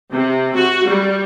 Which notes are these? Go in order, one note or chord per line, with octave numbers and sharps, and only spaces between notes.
C3
F#4
G3